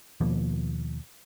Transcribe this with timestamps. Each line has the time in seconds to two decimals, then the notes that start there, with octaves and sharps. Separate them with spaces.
0.21 D#2 B2 F3 A#3